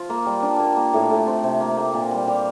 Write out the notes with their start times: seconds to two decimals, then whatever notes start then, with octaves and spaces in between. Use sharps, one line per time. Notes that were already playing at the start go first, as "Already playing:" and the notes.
Already playing: F3 F4
0.10 A#3
0.26 G3
0.43 D4
0.60 A#3
0.77 A#3
0.93 A2
1.10 A2
1.27 C4
1.44 C3
1.60 A#3
1.77 A#3
1.94 A#2
2.11 G3
2.28 G3